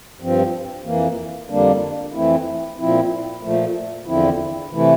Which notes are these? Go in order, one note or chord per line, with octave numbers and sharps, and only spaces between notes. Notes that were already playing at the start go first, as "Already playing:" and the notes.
G2 F3 C4
F2 E3 A#3
F2 D3 G3 A#3 D4
F2 E3 A3 C4 E4
A#2 F3 C4 E4
A#2 F3 A3
E2 D3 F3 C4 E4
C3 E3 A3 E4